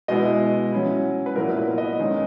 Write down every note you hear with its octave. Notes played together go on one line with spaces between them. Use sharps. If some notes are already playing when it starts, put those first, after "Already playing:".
B2 G#3 B3 E4 D#5
F#3 C#4 E4
B4
A#2 F#3 B3 E4 A#4
B4
D#5
D#3 G#3 C#4